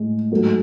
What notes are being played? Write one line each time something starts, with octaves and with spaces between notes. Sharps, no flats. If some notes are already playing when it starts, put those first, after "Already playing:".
Already playing: A2 G#3
G#2 F#3 A3